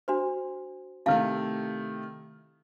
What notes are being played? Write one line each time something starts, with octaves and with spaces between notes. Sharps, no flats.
D4 F#4 C5
C3 D#3 A3 E4 F5 A5